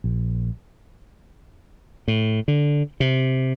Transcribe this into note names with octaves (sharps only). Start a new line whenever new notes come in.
A#1
A2
D3
C3